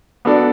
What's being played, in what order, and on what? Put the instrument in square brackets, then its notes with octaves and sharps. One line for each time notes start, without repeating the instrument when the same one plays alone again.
[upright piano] B3 D4 F#4 A4 D5